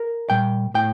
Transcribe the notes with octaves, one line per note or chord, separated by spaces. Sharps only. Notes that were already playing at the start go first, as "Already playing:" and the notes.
Already playing: A#4
A#2 G3 G5
A2 G5